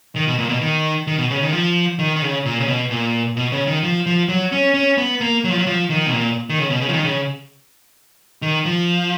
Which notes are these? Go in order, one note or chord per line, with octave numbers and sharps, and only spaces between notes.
D#3
B2
A#2
B2
D#3
D#3
B2
C#3
D#3
F3
D#3
D#3
C#3
A#2
C#3
B2
A#2
B2
C#3
D#3
F3
F3
F#3
C#4
C#4
B3
A#3
F#3
F3
F#3
F3
D#3
B2
A#2
D#3
C#3
B2
C#3
F3
D#3
C#3
D#3
F3